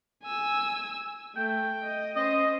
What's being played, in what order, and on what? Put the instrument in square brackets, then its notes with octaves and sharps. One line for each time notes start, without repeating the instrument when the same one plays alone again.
[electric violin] G#5 E6
[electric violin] A3 [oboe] G5
[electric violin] D#5
[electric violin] C#4 C5 [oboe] D#5